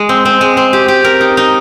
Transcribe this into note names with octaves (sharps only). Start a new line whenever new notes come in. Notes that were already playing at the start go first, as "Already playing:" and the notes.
Already playing: G#3
C4
C4
G#3
C4
G4
G4
A#4
D#4
D#4